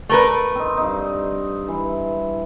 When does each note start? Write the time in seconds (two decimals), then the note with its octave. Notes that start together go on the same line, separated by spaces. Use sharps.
0.09 A3 A#4 B4
0.55 C4 D#4
0.77 G2 D#4
1.68 E3